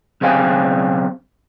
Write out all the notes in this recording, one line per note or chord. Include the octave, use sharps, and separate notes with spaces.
B1 C#3 C4 F5 G#5